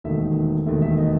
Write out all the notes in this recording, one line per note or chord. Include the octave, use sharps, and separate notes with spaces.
E1 D#2 D#3 A3 E5
E1 D#2 D#3 A3 E5
E5
D#5